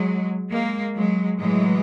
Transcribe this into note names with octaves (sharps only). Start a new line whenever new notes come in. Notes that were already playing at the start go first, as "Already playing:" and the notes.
Already playing: F#3 G#3
G#3 A#3
F#3 G#3
A2 E3 F#3 G#3